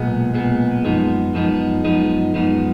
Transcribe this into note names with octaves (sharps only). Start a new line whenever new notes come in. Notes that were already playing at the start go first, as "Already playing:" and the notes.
Already playing: B1 A#2 G#3 B3
B1 A#2 G#3 B3
F#2 F3 G#3 B3 D#4
F#2 F3 G#3 B3 D#4
F#2 F3 G#3 B3 D#4
F#2 F3 G#3 B3 D#4